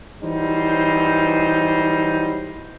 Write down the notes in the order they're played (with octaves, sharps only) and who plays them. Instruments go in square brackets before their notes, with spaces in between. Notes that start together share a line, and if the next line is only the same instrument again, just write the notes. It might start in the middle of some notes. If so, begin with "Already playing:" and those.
[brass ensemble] E3 F#3 G3 D#4 C5